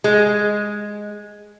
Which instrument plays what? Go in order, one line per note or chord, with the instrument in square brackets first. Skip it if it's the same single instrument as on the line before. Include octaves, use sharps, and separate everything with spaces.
[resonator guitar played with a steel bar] G#3